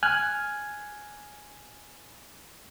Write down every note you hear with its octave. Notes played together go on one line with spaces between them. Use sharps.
G#5 F6 F#6 G#6